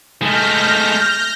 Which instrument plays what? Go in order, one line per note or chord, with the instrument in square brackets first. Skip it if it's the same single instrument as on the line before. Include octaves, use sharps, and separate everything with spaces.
[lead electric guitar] G#3 A3 [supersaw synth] F6 G6 A#6